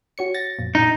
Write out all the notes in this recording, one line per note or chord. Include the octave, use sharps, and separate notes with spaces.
F#4 C#5 C#7
A6 A#6
F2 A#2
A#2 D#4 A#5